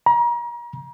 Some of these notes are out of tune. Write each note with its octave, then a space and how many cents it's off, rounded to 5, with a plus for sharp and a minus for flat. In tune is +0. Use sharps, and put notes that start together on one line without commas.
A#5 +35